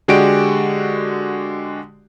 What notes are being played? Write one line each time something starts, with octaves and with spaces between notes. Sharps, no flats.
D3 G#3 F#4 G4 D5 D7